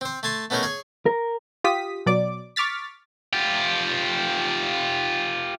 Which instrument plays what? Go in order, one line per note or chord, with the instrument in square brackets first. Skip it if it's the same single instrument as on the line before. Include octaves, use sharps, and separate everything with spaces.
[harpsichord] C4 C5
A3 G#5 A5 C6
A3 B3 C#4 D#4 G#4 A#4
G#4 C#5
[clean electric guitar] A#4
[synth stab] F4 G4 D#6 B6
B2 F#3 D5 D6
C#6 D6 F6 A6 B6
[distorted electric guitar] F4 G4